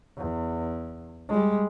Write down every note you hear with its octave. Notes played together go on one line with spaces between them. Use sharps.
E2
G3 G#3